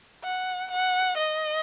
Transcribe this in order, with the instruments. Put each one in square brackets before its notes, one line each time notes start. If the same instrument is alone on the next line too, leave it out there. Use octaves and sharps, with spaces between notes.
[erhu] F#5
F#5
D#5